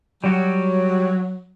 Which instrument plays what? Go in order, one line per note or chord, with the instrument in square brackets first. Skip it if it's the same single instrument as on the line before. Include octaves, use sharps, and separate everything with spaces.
[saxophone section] F#3 [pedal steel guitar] G3 F#4